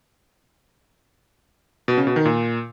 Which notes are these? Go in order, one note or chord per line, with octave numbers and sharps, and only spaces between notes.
B2
C#3
B2
D#3
A#2